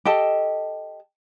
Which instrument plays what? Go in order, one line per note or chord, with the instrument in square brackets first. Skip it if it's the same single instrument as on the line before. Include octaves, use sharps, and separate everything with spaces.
[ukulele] G4 A4 D#5 A5